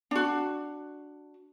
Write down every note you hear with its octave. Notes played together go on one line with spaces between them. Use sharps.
D4 F#4